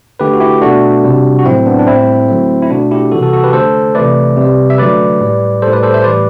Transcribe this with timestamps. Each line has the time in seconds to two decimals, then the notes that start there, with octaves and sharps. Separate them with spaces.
0.20 D3 A3 G4 B4
0.34 F#4
0.40 E4 G4
0.62 B2 A3 D4 F#4
1.04 C3 G3
1.39 F#4
1.45 A2 F#3 A3 C4 E4
1.66 B3 D4
1.79 D4
1.87 A2 G3 C4 E4
2.28 D3 F#3 A3
2.62 E4
2.70 B2 A3 D4 F#4
2.91 E4 G4
3.11 C3 E3 G3 F#4 A4
3.22 F#4 A4
3.33 F#4 A4
3.43 G4 B4
3.53 D3 A3 A4 C5
3.95 C3 E3 A3 B4 D5
4.37 C3 G3
4.70 E5
4.78 D3 F#3 A3 B4 D5
5.21 A2 G3
5.62 A2 G3 A4 C5
5.73 B4 D5
5.83 A4 C5
5.94 C5 E5
6.04 A2 E3 G3 B4 D5